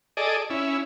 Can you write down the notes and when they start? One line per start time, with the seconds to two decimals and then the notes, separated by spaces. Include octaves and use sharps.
0.17 G#4 A4 D5 D#5
0.50 C#4 E4